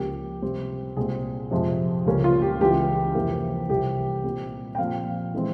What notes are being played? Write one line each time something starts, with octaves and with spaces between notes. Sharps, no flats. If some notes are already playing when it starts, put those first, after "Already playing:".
Already playing: C#2 C#3 F3 A#3 G4
C3 G3 C4
C2 A#2 G#3 C4 G#4
F2 C3 F3 G#3
C#2 C#3 G3 A#3 C#4
F4
G4
C#2 C#3 E3 G#3 G4
F2 C3 E3 A#3
C2 C3 E3 G3 A#3 G4
A#2 G3 C4
G5
A#2 F3 C4 F5
E3 G#3 C4